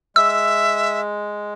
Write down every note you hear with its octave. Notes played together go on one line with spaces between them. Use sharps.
G#3 E5 E6